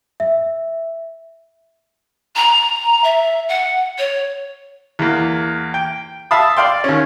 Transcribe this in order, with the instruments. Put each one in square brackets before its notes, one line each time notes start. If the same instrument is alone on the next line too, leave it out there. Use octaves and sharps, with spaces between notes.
[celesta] E5
[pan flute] A#5
E5
F#5
C#5
[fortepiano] E2 A#3
G5
E5 F5 A5 B5 D#6
D5 F5 G5 C6
D#2 C#4